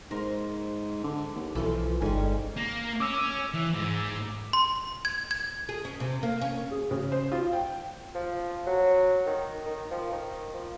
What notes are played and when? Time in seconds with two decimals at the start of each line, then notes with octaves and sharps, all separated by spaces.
0.11 G#2 A#4 C5
1.04 D3
1.35 D#2
1.55 B1 E3 F3 F4 A4
2.02 G1 G#2 G3 C#4
2.57 A#3
3.00 C#4 D6 E6
3.54 E3
3.74 G#2
4.53 C6
5.05 G#6
5.31 G#6
5.69 G#4
5.85 C#4
6.00 C3
6.23 A#3
6.41 C#4
6.71 G#4
6.91 C#3
7.12 C5
7.32 F4
7.53 G5
8.15 F3
8.66 F#3
9.26 D#3
9.66 D#3
9.91 F3
10.12 D#3
10.53 F3